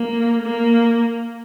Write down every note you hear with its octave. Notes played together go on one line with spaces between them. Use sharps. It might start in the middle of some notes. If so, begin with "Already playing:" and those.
Already playing: A#3
A#3